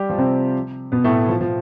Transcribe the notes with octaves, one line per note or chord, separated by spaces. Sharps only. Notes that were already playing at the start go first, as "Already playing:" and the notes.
Already playing: G3 G4
F3 F4
C3 C4
B2 B3
A2 A3
F3
F3